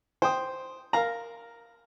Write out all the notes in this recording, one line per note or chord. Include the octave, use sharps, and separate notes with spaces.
C5 G5 D#6
A#4 F5 A#5